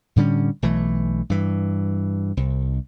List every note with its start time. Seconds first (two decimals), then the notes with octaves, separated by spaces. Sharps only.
0.16 A2 D3 G3 C#4
0.62 B1 E3 A3
1.30 G2 E3
2.37 C2